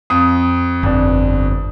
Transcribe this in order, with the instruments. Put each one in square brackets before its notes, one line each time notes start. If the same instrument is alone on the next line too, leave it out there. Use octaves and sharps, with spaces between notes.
[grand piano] F2 D#6
[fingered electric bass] G1 [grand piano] F2 D4